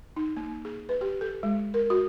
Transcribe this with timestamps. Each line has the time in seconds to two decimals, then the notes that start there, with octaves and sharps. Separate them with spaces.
0.16 D#4
0.37 A#3
0.65 G#4
0.89 B4
1.01 G4
1.21 A4
1.43 G#3
1.74 A#4
1.90 F#4